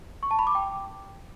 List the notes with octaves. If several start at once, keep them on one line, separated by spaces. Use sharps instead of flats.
C#6
A5
B5
D6
G5